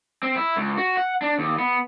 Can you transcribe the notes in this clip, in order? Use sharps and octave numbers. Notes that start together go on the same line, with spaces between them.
C4
E4
C#2
F#4
F#5
D4
D#2
B3